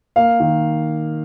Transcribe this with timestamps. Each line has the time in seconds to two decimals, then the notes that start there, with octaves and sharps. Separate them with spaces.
0.16 A#3 F5
0.40 D#3